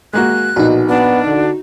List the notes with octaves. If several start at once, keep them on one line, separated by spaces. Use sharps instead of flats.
G#3 A#3 F#4 F#6
A#1 B2 D#4 F#4
B3 D4
D3